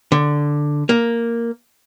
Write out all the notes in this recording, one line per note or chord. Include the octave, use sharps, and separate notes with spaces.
D3
A#3